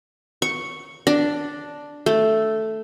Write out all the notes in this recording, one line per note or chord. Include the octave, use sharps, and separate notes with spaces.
C#6
D4
A3